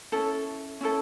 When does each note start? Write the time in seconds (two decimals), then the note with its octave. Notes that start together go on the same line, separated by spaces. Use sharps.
0.12 C#4 E4 A4
0.81 C#4 E4 A4